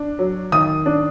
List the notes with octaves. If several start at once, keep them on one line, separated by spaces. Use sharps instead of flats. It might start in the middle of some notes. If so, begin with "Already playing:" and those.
Already playing: D4
F#3
D#3 D#6
D4